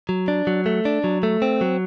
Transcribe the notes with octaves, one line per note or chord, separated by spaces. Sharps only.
F#3
D4
F#3
A3
D4
F#3
A3
C4
F#3